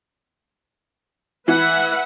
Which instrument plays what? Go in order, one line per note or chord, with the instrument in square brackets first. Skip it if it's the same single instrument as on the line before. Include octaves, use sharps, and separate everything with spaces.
[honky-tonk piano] E3 [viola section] B4 E5 F#5